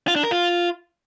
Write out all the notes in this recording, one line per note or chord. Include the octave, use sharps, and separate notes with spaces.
F4
D4
A#4
F4